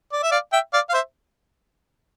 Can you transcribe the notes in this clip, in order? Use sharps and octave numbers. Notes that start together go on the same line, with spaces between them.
D5
E5
D5 F5
E5 G5
D5 F5
F5
C5 E5